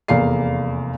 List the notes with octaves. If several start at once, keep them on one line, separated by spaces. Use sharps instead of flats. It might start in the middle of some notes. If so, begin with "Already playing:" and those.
F1 E2 A#3 F5 C7